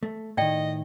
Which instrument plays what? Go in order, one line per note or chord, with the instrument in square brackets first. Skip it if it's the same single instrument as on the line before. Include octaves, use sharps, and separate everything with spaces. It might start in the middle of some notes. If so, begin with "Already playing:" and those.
[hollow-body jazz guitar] A3
[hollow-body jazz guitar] A2 D#3 [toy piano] D5 G5 [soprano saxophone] D#5